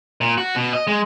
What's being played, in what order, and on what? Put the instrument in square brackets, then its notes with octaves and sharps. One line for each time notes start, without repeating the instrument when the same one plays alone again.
[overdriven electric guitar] A#2
F#4
B2
D#5
G#3